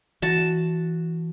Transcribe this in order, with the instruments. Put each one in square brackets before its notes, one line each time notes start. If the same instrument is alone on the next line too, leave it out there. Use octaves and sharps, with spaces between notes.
[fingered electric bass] E3 [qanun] F#4 A5